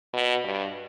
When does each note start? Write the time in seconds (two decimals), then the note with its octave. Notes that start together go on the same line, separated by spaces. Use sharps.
0.14 B2
0.44 G2